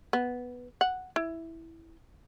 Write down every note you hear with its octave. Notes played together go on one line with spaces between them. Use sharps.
B3
F#5
E4